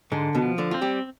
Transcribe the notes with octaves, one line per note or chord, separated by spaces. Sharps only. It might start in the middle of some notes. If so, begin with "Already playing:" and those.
G#2 D3 G#3
B2 B3
F3
D3 D4
C4 F4
G3 G4